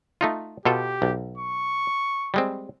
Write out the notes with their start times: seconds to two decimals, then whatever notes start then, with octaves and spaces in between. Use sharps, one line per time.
0.21 A3 D#4 F4
0.65 B2 F4 G4 A4
1.02 B1
1.38 C#6
2.34 G3 G#3 C4